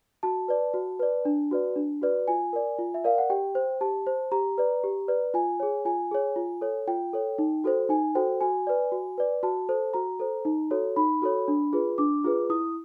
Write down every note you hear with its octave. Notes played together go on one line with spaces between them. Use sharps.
F#4 A5
B4 D5
F#4
B4 D5
D4
F#4 B4 D5
D4
F#4 B4 D5
F4 G#5
A#4 D5
F4
E5
A#4 D5 F5
F#5
G4 G5
C5
G4 A5
C5
G4 A#5
B4 D5
G4
B4 D5
F4 G#5
G#4 C#5
F4 G#5
G#4 C#5
F4
A4 C#5
F4 G5
A4 C#5
D#4
F#4 A4 C5
D#4 G#5
F#4 A4 C5 G5
F#4 G#5
B4 D5
F#4
B4 D5
F#4 A5
A4 C5
F#4 A#5
A4 C5
D#4
F#4 A4 C#5
D#4 B5
F#4 A4 C#5
D4
F4 G#4 B4
D4 D6
F4 G#4 B4
E4 D#6